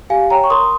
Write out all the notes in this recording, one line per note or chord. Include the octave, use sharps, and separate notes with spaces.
G4 F5 G#5
C#5 G5 A#5
C#6
A#4 C6 D#6